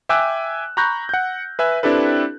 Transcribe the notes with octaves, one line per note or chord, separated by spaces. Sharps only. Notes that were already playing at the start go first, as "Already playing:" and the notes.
E5 G5 G#5 D6 E6 F#6
A#5 B5 C#6 F#6 G6 A#6
F#5 G6
B4 E5 G#5 F#6
C4 D4 E4 G4 A4 B4